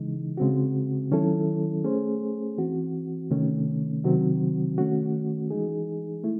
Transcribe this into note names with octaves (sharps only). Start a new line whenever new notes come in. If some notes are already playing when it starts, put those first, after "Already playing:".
Already playing: C#3 E3 G#3 D#4
C#3 G#3 C4 F#4
D#3 F#3 C#4 E4 A4
A3 C#4 G#4 C5
E3 C4 F#4
C3 D#3 A3 C#4
C3 D#3 F#3 C4 F#4
D#3 A3 C#4 F#4
E3 G#3 D#4 G#4
A3 E4